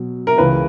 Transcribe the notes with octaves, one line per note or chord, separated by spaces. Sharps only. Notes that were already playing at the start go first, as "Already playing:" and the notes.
Already playing: B2 F#3
A#4
C#2 C#3 E3 B4